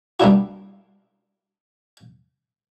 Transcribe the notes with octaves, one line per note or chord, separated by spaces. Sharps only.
G3 A#3 B3 D4 E4 F#4